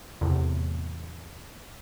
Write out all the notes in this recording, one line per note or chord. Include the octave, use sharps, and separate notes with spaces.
E2 A2 C3